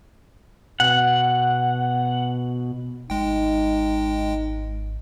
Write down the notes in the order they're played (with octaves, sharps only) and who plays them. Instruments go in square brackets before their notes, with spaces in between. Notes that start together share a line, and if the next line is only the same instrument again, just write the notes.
[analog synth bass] B2 [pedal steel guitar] F#5
[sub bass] G#1 [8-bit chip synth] G#3 G5 [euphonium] D#4